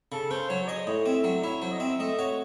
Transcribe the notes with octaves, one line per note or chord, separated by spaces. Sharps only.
C#3 A4
C#4 C5
F#3 C#5
C#5
G#4 D#5
A2 C#5
C4 E5
F#3 E5
E4 C#5
F#3 C5
D#5
C4 E5
A3 D#5
F#4 C#5